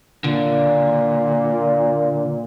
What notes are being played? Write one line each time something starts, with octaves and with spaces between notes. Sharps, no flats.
A#2 D3